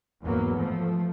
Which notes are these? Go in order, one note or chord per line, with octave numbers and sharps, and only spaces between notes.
E2 G#2 F#3 A#3 B3
F3 A3